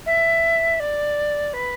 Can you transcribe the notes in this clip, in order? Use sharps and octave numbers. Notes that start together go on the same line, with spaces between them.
E5
D5
B4